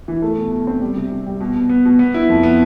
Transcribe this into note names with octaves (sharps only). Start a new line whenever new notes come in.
E3
A3
B2
B2
C4
G3
C3
C3
G3
B2
B2
B3
B2
B3
E4
F2
B3